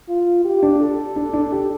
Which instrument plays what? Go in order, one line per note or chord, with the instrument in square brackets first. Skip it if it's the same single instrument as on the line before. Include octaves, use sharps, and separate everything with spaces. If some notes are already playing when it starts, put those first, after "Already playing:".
[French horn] F4
G4
[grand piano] D4
[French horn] A4
[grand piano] D4
D4
G4